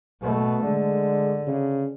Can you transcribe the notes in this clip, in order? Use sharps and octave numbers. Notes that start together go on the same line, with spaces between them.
B2 A3
D3 G#3
C#3